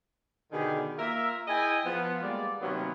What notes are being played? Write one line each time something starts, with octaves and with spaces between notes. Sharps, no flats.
B2 D3 D#3 G4 G#4
A#3 F4 A#4 E5
E4 G#4 D#5 G5 G#5
F3 B3 F4
G3 G#3 A#3 D5
C3 D#3 F#3 A#3 B3 C#4